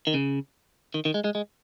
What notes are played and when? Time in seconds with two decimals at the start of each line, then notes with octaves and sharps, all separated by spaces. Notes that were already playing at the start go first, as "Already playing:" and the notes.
0.07 D#3
0.14 C#3
0.94 D#3
1.05 D#3
1.14 G#3
1.24 G#3
1.35 G#3